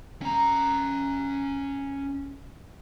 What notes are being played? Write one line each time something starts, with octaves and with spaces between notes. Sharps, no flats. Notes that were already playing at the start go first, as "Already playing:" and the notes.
C#4 A#5